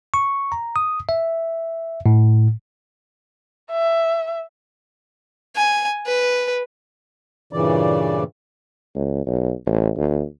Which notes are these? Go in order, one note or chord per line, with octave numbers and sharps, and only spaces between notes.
C#6
A#5
D#6
E5
A2
E5
G#5
B4
G2 A#2 C#3 E3 D5
C#2
B1
A1
D2